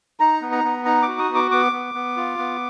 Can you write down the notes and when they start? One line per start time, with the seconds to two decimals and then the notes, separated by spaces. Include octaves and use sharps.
0.20 D#4 A#5
0.42 B3
0.52 A#5
0.64 B3
0.85 D#4 A#5
1.02 D6
1.08 F#4
1.18 D#6
1.29 B3
1.35 D6
1.51 B3 D6
1.72 B3
1.94 B3
2.17 F4
2.38 B3